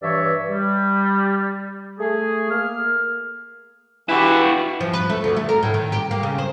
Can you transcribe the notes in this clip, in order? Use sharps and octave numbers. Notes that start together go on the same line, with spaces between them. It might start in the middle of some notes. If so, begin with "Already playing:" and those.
G2 E3 C#5 D5 E5
G3
A3 G#4
A#3 F6
E3 E4 F#4 G4 B4
F3
B4
A3
D2
A3
A#4
A2
D#3
G4
A#3
C#3
C5